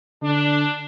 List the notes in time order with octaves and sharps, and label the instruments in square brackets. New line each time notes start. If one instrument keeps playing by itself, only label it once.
[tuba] D3 [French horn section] D4